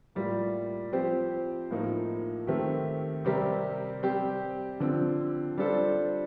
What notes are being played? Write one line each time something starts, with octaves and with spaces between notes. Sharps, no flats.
A2 G3 A#3 F4
F3 C4 G4 C5
A2 F3 A#3 D#4
D#3 A3 C4 G4
C3 G3 C4 G4 A#4
G3 C4 G4 C5
D3 F3 C4
G3 D4 F4 A4 C5